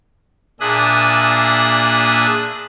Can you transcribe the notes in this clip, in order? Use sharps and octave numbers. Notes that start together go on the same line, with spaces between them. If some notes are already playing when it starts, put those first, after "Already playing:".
A#2 D4 G#4 E5 D#6 F#6